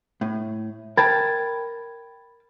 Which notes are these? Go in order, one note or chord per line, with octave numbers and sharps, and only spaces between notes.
A2
A#4 G5 A5 B5 G#6 A6